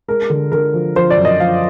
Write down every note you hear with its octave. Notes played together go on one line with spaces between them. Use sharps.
G#3 A#4
D3
D3 A#4
F3
F3 C5
D5
F#2
D#5
F3 F5